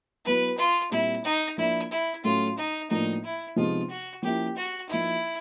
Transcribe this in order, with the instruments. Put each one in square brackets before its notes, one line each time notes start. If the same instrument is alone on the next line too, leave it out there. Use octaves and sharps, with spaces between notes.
[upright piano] F#3 B3 E4 [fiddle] B4
[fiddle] F4
[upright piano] A#2 G3 C4 [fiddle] E4
[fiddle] D#4
[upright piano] F3 A#3 D4 [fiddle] E4
[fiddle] E4
[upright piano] A2 F#3 A3 C#4 [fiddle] F4
[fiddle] D#4
[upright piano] A2 F3 A#3 D4 [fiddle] D#4
[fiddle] E4
[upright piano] C3 F3 G#3 B3 D#4 [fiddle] F4
[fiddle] F#4
[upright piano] F3 A#3 C#4 E4 [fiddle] G4
[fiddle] F#4
[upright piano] F3 A#3 D#4 [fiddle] E4